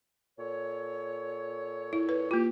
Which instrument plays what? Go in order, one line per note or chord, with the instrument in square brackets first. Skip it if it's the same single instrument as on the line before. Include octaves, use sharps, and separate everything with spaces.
[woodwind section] A#2 A4 C#5
[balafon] E4
B4
[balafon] A#3 F4 [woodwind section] G4